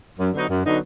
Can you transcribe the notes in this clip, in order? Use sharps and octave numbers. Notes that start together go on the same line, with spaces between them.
F#2
D3 F#3 B3 D#4
F#2
D3 F#3 B3 D#4